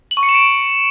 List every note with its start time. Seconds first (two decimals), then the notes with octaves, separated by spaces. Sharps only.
0.11 F#7
0.17 C#6
0.23 C#7
0.29 E7
0.35 D7